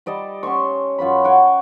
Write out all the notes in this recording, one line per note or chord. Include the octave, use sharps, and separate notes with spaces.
G3 D5 D#5 A5
C#4 A5 C6 C#6
F#2 F4 C#5 B5
C#5 F#5 G5